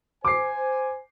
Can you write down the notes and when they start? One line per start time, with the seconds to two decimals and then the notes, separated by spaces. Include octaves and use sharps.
0.25 C5 G#5 D6 C7